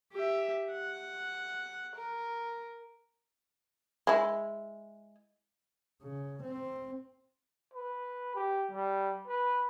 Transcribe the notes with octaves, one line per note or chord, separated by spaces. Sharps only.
G4 E5
F#5
A#4
G#3 E4
C#3
C4
B4
G4
G3
B4